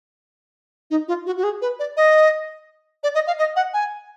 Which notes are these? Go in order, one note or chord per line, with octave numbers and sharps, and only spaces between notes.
D#4
F4
F#4
F#4
G#4
B4
D5
D#5
D5
D#5
F5
D#5
F#5
G#5